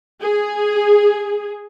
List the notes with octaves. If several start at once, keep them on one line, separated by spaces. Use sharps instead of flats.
G#4